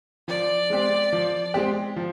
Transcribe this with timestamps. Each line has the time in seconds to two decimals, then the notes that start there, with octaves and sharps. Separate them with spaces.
0.28 F3 D5
0.70 G#3 C4 G4
1.13 F3
1.54 G#3 C4 G4
1.96 F3